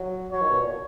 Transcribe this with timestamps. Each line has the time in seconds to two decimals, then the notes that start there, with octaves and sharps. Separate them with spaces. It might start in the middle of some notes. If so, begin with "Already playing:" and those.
Already playing: F#3
0.32 F#3 C#5
0.41 D#3
0.50 B2
0.60 A#2